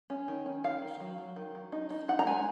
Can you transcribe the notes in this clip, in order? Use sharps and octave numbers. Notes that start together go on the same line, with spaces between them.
C#4
D#3
C#4
D#3 F5
D#3
F#3
F#3
D#3
F#3
D#4
D#4
D#4 F#5
A#5
G#3 G#5